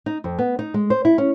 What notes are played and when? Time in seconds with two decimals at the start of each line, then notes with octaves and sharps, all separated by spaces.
0.06 D#4
0.24 F2
0.39 B3
0.59 D#4
0.74 G#3
0.90 C5
1.05 E4
1.18 C#4